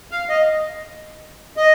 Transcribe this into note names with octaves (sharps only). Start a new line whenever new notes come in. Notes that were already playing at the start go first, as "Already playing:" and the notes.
F5
D#5
D#5